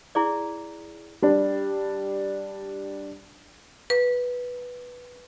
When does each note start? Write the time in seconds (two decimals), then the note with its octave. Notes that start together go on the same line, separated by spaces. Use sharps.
0.15 E4 G#4 D5
1.22 G3 D4
3.90 B4